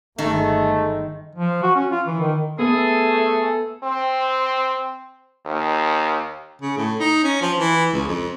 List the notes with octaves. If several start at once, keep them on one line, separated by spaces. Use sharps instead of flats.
G1 D#3 G#3 A3
F3
F#4
C#4
F4
E3
D#3
A3 B3 G#4 A4
C4
D#2
C#3
A2
D#4
C#4
F3
E3
C#2
F2